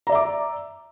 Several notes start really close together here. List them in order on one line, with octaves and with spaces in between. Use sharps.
A#5 D5 E5 D6